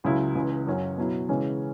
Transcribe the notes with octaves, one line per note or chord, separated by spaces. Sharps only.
C#2 C#3 F#3 E4
C#2 C#3 E3
F#2 F#3 C#4 F#4
B2 F#3 E4
C#3 E3 G#3 C#4